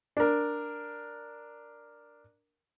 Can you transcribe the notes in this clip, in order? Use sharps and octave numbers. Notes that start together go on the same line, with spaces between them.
D4 A#4